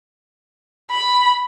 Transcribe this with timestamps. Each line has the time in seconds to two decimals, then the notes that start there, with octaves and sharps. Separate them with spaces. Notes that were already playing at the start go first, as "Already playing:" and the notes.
0.91 B5